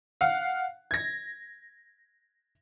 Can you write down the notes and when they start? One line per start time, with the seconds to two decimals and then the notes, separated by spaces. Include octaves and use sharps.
0.21 F5 F#5
0.91 G#6 A#6